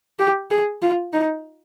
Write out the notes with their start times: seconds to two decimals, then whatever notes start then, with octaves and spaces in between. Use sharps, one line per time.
0.19 G4
0.51 G#4
0.82 F4
1.13 D#4